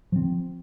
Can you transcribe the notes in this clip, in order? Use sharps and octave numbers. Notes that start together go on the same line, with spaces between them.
F3 C4